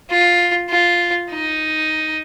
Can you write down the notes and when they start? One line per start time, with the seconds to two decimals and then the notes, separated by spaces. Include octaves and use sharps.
0.10 F4
0.70 F4
1.30 D#4